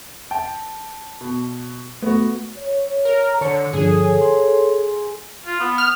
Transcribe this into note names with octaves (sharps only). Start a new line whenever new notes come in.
G5 A5
B2
A3 B3 F#4
C#5
A#4
D3 C#5 A5 C#7
G2 D3 F3 G#4 A4 C#5
C6
F4
B3
F6